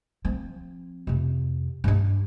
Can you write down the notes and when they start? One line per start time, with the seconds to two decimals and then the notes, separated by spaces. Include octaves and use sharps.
0.25 F3 C4
1.07 F2 C3
1.84 G2 D4